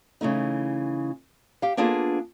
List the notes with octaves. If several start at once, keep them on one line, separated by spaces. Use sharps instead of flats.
C#3 E3 A3 D#4
G4 F5
A#3 B3 D4 F4 G#4 A4